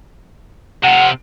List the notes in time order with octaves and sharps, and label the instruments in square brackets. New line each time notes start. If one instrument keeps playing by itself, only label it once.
[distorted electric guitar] C3 F4 [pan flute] F#5